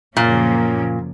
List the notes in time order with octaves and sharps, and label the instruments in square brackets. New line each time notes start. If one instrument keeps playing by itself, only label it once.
[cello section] F#2 C#3 F3 A#3 C#4 [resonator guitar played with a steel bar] A#2